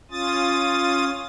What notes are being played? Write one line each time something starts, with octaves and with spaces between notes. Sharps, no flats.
C#4 F4 D#6 A6